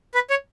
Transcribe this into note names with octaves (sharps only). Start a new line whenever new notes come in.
B4
C#5